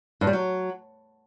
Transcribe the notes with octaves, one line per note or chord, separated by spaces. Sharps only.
G2
G3
F#3